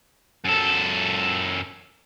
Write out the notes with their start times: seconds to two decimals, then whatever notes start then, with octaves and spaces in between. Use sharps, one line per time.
0.45 F#2 A4